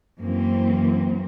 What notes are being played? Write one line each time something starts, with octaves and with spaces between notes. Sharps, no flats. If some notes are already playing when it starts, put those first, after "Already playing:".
F#2 E3 A#3 C4